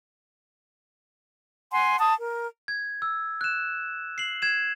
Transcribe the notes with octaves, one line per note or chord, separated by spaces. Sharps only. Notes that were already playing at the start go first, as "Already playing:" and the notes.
F#5 G#5 C6
A5 D#6
A#4
G#6
E6
F#6 E7
C7 F#7
G#6 E7